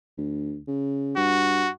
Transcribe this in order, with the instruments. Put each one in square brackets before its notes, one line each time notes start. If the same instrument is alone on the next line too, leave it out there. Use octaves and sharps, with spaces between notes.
[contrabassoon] D2
C#3
[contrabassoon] G2 [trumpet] F#4